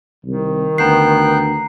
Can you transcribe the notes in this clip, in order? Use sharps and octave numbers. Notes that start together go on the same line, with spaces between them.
C2 D#3
D2 B3 G5 A#5 F#6 C7